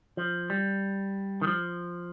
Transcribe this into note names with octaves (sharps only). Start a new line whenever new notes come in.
F3
G3
D#3
F3